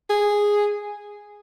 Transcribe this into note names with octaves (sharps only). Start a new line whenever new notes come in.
G#4